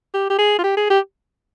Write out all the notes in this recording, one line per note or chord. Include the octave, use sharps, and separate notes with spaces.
G4
G4
G#4
F4
G4
G#4
G4